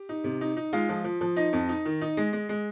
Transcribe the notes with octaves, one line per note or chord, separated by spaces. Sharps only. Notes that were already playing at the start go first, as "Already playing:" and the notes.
Already playing: G4
D#4
C3
D#4
D#4
G#3 F4 F5
F3
F3
F3
D#4 D#5
F2
D#4
D#3
D#4
G#3
G#3
G#3